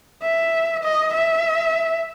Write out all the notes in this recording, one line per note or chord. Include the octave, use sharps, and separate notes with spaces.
E5
D#5
E5